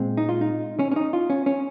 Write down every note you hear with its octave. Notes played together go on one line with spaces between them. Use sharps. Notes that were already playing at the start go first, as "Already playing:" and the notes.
Already playing: A#2 G#3 C4
D#4
F4
D#4
C#4
C#4
D#4
F4
C#4
C#4